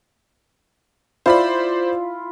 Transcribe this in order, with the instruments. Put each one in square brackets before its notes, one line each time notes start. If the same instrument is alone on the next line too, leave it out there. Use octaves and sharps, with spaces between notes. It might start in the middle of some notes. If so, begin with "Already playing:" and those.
[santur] E4 F4 [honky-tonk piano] C5 D5 B5